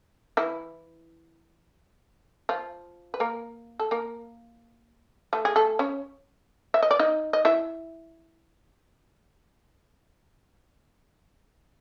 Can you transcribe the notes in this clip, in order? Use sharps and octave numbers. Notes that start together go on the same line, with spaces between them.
E3 E4
F3 F4
B4
A#3 A#4
A4
A#3 A#4
A3 A4
G#4
A3 A4
C#4 C#5
E5
D#5
D5
D#4 D#5
D#5
E4 E5